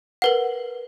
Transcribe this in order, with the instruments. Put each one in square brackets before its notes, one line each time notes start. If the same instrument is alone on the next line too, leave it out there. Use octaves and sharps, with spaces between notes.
[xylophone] A#4 B4 F#5